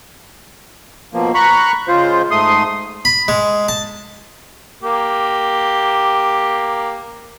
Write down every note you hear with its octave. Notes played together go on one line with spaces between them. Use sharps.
B2 F3 A#3
A#5 B5 C#6 F#6
C#3 G#3 F4 C5
G#2 A3 C6 D#6
B5
G#3
A5
A#3 G4